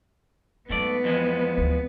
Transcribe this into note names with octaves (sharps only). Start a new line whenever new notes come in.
G#2 F#3 A3 B3 D5
F2 E3 G#3
D2